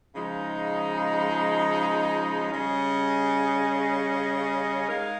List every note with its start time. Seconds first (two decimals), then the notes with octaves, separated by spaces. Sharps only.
0.14 C#3 F3 G#3 D#4
2.51 C#3 G3 C#4 G#4 D#5
4.88 G#3 D#4 A#4 F5